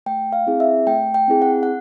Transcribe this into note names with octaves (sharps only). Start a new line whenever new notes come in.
A3 G5
F5
C4 E4 G#4
E5
A3 G5
G5
C4 E4 G#4
F#5
F#5